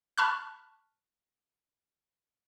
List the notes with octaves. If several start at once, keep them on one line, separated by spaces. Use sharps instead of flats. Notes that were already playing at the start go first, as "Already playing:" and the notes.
A5 B5 C#6 F6 F#6